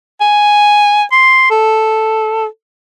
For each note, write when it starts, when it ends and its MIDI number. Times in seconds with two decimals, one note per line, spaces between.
0.21 1.03 80
1.11 1.49 84
1.50 2.46 69